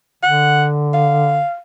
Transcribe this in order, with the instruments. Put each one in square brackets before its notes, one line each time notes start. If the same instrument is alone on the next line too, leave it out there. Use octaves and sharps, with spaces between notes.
[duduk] D3 [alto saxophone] F#5
[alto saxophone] F5